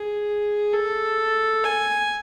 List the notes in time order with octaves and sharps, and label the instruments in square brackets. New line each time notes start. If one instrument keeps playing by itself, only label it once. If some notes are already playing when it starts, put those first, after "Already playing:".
Already playing: [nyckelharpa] G#4
A4
G#5